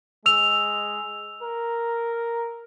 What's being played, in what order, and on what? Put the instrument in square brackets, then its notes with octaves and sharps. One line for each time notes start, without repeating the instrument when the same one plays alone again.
[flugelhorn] G#3 [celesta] E6 F7
[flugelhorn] A#4